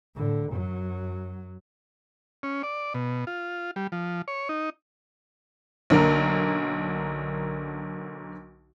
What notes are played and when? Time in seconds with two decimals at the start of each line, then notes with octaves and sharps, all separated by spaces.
0.15 A2 D3
0.49 F#2 F#3
2.43 C#4
2.63 D5
2.94 B2
3.27 F4
3.76 G3
3.92 F3
4.28 C#5
4.49 D#4
5.90 B1 D3 A#3 A#4